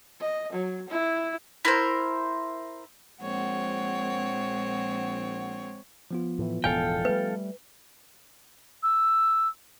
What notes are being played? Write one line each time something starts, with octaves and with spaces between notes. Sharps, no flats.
D#5
F#3
E4
E4 A#4 C5
A#1 G#3 C4 C#5 F#5
F3 B3 F4
A2 E3
E1 E2 A2 A4 F5 G5 G#5
G3 A3 B4
E6